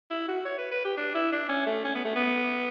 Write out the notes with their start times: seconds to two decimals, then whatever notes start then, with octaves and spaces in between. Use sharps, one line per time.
0.11 E4
0.28 F#4
0.45 C#5
0.58 B4
0.71 B4
0.84 G4
0.97 D4
1.15 E4
1.32 D4
1.49 C#4
1.67 A3
1.85 C#4
1.95 B3
2.05 A3
2.16 B3